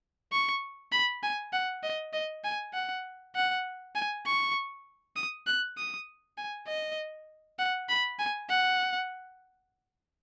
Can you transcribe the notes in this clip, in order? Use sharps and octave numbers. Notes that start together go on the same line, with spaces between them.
C#6
B5
G#5
F#5
D#5
D#5
G#5
F#5
F#5
G#5
C#6
D#6
F#6
D#6
G#5
D#5
F#5
B5
G#5
F#5